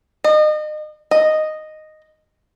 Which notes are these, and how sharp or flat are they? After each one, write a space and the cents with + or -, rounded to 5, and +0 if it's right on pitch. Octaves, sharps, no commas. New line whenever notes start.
D#5 -35
D#5 -5